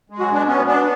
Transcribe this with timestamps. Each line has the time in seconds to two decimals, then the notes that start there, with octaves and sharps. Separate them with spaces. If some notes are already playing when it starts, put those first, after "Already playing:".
0.10 G#3
0.19 F#3 F#4
0.28 B2 D4
0.47 B3 C#4
0.67 B3 D4